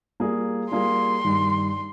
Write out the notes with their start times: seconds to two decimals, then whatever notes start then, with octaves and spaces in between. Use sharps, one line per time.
0.20 G3 A#3 F4 G#4
0.72 G3 A#3 F4 G#4 C6
1.25 G2 D#3 G3